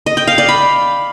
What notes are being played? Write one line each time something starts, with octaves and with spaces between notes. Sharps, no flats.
D#5
G5
F5
D5
B5